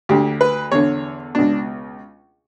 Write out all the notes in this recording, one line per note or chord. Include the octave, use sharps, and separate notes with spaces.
D2 D3 G4
B4
E2 D3 C#5
C#2 B2 D4